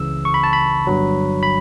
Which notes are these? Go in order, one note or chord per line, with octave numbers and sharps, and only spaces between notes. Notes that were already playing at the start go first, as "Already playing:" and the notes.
Already playing: C#2 C#3 E3 E6
C#6
B5
A5
B5
G1 G2 F#3
B5